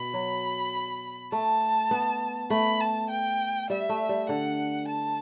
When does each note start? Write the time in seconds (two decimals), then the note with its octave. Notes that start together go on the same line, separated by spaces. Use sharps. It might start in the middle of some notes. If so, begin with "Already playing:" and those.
Already playing: B2 B5
0.14 F#3
1.32 A3 A5
1.91 B3
2.50 A3 B5
2.81 A5
3.10 G5
3.70 G3 E5
3.89 A3
4.09 G3
4.29 D3 F#5
4.88 A5